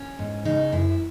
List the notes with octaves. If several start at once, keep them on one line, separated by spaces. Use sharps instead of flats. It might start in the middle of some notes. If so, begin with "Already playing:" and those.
Already playing: C#4
G#2
C#3 D#4
F#2 E4